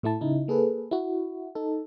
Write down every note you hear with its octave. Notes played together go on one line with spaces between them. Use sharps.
A2 A3 E4 A5
C#3 D#4 E4
A#3 G#4 A4 B4
E4 F#4
D#4 A4